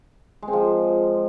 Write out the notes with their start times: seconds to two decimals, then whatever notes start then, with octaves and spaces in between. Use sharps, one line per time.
0.43 G#3
0.48 C4
0.53 F3